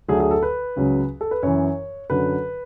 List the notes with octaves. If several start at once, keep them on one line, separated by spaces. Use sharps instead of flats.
D2 D3 F#3 G#4
G#4
A4
B4
C#2 C#3 F#3
A4
B4
F#2 E3 C#5
F#2 D3 F#3 B4